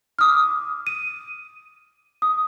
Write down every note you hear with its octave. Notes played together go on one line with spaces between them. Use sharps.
D6 D#6 F6
D#7
D#6